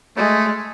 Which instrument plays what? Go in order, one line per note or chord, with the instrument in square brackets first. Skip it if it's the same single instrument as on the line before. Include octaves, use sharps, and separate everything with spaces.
[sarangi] G#3 [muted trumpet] A3